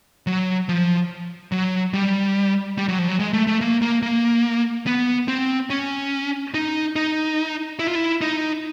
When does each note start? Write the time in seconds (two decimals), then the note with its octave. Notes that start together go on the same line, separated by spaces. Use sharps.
0.27 F#3
0.69 F3
1.52 F#3
1.93 G3
2.78 G3
2.88 F#3
2.99 F3
3.08 F#3
3.20 G#3
3.33 A3
3.47 A3
3.61 A#3
3.82 A#3
4.02 A#3
4.87 B3
5.28 C4
5.70 C#4
6.54 D#4
6.96 D#4
7.79 E4
7.87 F4
7.95 E4
8.21 D#4